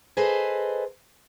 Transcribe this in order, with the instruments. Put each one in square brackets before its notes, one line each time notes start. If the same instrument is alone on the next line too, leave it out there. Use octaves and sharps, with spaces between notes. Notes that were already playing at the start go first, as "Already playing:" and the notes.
[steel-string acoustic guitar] G#4 A4 B4 C5 D#5